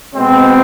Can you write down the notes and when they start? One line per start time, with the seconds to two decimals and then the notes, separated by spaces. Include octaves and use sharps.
0.14 B2 G#3 C4